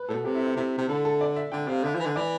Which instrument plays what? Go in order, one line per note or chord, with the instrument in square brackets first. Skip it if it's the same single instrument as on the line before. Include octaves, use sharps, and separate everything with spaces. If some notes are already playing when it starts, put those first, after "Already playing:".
Already playing: [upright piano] B4
[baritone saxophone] A2 [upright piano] A4
[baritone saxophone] B2
[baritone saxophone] C3 [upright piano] G4
[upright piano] E4
E4
[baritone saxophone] C3 [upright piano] E4
[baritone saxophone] C3
[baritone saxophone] D3 [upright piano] A4
[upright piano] A4
D5
E5
[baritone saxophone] D3 [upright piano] G5
[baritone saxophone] C3 [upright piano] F5
[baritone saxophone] D3 [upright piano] E5
[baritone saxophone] F3
E3
D3
[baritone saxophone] E3 [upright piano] D5